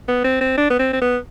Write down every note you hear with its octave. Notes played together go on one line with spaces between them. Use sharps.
B3
C4
C4
D4
B3
C4
C4
B3